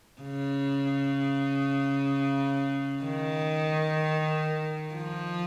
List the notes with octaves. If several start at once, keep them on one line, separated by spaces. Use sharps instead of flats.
C#3
D#3
F3